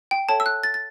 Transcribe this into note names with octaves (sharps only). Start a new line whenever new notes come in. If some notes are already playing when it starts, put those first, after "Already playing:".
G5
A4 C#5 E5 G5 A5
E6
F#6
A6
A6